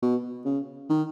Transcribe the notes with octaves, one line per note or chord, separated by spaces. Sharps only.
B2
C#3
D#3